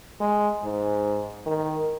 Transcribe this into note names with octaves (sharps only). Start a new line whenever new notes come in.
G#3
G#2
D#3